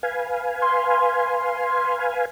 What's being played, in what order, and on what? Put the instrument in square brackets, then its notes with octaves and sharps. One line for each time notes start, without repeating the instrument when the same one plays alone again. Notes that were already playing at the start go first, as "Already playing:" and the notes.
[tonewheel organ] B4 F5 G#5
[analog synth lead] C6